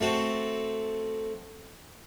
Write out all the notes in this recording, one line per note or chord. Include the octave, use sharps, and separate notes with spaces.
A3 C4 F#4